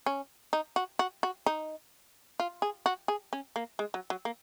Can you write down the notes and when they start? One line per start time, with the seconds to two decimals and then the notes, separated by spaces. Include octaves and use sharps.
0.06 C#4
0.53 D#4
0.76 F#4
0.99 F#4
1.23 F#4
1.46 D#4
2.40 F4
2.62 G#4
2.86 F#4
3.08 G#4
3.33 C#4
3.56 A#3
3.79 G#3
3.94 F#3
4.10 F#3
4.25 A#3